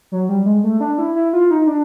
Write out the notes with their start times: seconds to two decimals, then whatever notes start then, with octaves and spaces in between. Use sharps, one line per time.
0.12 F#3
0.29 G3
0.46 G#3
0.64 A3
0.80 D4
0.98 E4
1.16 E4
1.33 F4
1.51 D#4
1.67 D4